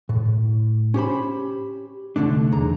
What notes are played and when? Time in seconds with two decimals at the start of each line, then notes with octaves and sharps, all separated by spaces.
0.09 A2
0.94 C#4 G4 C5 B5
2.16 C2 G2 D3 A3 D4
2.52 B1 E2 D3 A#5